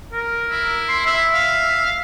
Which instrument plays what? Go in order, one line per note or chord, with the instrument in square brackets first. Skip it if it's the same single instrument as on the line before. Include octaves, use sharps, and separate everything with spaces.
[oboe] A#4
[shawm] E4
[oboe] C6
[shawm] E4 [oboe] E5
[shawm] F5